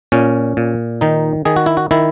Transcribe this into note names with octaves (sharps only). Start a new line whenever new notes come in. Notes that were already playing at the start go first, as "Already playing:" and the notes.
A#2 C#4
A#2
D#3 D#4
D#3 G#4
F#4
E4
F#4
D#3 E4